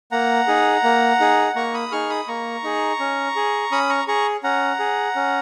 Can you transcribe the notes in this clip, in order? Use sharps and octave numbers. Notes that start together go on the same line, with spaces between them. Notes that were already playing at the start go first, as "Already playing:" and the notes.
A#3 F#5 A#5
D#4 G#4
A#3
D#4 G#4
A#3 A#5 C#6
B5 D#6
D#4 G#4 C#6 F6
B5 D#6
A#3 A#5 C#6
D#4 G#4
C#4
G#4
C#4 B5 D#6
A#5 C#6
G#4 A#5 C#6
C#4 F#5 A#5
G#4
C#4